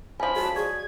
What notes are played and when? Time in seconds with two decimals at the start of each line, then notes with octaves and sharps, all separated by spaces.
0.20 F3 C#4 G#5 B5
0.36 F#4 A4 D#5 A5
0.56 G#4 D5 C#6 G#6